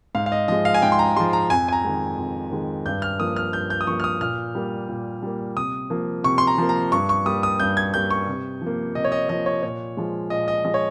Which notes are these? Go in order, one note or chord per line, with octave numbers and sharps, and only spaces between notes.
G#2 F5
F5
D#5
F3 G#3 D#5
F5
G#5
G#2 G5
C6
A#5
F3 G#3 C6
A#5
F2 G#5
G#5
A#5
D#3 G#3
F2
D#3 G#3
G2 G6
F6
F3 A#3 D#6
F6
G2 G6
G6
D#6
F3 A#3 C#6
F6
D#6
A#2 F6
G3 A#3
A#2
G3 A#3
C3 D#6
F3 A#3
C3 C#6
C6
A#5
F3 A#3
A#5
G2 C#6
C#6
G3 A#3 D#6
D#6
G2 G6
G#6
G3 A#3 G6
C#6
C3
F3 A#3
C3 D#5
C#5
D#5
F3 A#3 D#5
C#5
A#2 C#5
F3 G#3
A#2 D#5
D#5
F3 G#3 D#5
C#5